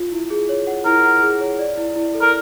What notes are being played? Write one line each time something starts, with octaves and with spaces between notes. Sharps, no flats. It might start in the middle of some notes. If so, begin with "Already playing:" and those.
Already playing: F4
E4
G#4
C#5
F#5
E4 A#4
F#5
G#4
C#5
D5
E4
E4
A4
A#4